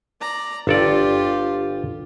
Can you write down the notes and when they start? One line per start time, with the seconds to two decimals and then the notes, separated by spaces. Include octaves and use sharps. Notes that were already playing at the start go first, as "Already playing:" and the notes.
0.20 D5 A#5
0.67 G1 F4 G4 A4 D5